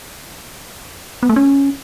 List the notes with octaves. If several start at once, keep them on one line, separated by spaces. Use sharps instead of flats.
B3
A3
C#4